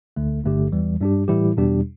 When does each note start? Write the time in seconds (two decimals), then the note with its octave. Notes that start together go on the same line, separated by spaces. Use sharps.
0.16 D2 D3 A3
0.44 G1 G2 D3 A3 G4
0.72 E2 E3 G3
1.01 G2 G3 D4 G4
1.28 A2 E3 G3 E4 G4
1.57 E2 B2 G3 D4 G4